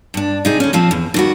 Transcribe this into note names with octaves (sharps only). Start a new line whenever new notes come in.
G2 D4
C3 D#4 G#4
D2 C#4
A#2 F3 C4
E2
D#3 G3 F#4